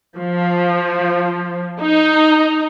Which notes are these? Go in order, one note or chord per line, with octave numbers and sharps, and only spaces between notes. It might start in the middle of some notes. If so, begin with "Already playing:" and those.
F3
D#4